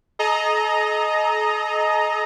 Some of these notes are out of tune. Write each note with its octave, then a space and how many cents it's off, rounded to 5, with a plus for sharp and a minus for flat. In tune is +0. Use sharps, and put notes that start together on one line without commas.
A4 -45 D#5 +0 A#5 +0